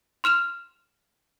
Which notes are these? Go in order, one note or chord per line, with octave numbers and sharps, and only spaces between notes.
C6 F6 E7 F7